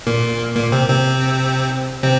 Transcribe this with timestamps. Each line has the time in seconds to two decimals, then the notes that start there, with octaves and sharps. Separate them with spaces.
0.07 A#2 A#3
0.55 A#2 A#3
0.72 C3 C4
0.88 C3 C4
2.03 C3 C4